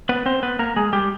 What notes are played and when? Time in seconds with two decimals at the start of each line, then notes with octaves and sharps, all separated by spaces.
0.09 B3 B4
0.26 C4 C5
0.43 B3 B4
0.59 A#3 A#4
0.76 G#3 G#4
0.93 G3 G4